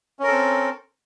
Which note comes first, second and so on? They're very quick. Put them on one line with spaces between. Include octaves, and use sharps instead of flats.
C#4 A#4 A4 C4